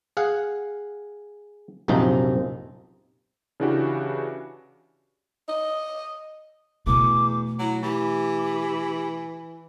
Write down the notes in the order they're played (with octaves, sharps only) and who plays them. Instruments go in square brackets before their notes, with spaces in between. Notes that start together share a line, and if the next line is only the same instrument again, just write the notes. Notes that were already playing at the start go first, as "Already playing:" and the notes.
[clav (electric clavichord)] G#4 F5 F#5
A#1 F#2 C3 F3 D#4
[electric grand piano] C#3 E3 D4 E4 F#4 G4
[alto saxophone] D#5
[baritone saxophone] E2 [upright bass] B2 A3 [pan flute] D6
[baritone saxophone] F#3 [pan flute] E4
[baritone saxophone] E3 [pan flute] G4